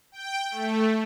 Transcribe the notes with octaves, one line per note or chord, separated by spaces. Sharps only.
G5
A3